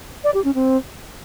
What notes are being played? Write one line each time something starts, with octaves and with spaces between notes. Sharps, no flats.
D5
G4
C#4
C4